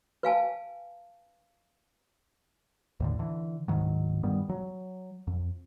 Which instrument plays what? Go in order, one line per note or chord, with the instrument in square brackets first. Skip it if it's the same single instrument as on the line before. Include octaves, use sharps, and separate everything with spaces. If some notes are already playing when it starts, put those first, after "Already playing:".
[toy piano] B4 F5 G#5 A5
[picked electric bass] D#2 A2 D3
D3 E3
D1 G#2 D#3 F#3
G2 D#3 G3 B3
F#3
F2